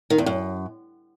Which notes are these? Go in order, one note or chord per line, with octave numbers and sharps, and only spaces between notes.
D#3
E2
F#2